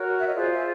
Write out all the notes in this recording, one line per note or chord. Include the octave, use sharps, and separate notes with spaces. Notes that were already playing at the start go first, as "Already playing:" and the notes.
Already playing: F#4 A#4 C#5
E5
D#5
F4 G#4 C5 D5
E5